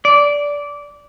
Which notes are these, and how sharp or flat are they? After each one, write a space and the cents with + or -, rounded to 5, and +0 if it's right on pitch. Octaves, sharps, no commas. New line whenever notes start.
D5 -15